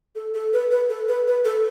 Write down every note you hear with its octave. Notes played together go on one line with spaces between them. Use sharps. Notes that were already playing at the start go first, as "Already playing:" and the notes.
A4
A4
B4
B4
A4
B4
B4
A4